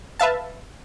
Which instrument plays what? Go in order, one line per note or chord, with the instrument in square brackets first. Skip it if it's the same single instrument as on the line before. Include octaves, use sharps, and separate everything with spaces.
[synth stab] B4 E5 F5 A5